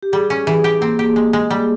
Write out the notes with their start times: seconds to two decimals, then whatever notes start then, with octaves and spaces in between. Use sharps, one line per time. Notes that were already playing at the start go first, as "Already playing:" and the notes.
0.03 G4
0.13 G3 G#4
0.30 C#4
0.47 E3 G#4
0.64 G4
0.81 A#3 C4
0.99 G4
1.16 G#3
1.33 G#3
1.51 G3